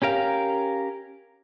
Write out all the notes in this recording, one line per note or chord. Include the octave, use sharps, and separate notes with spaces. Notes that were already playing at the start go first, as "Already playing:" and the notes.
C#4 G4 A#4 F5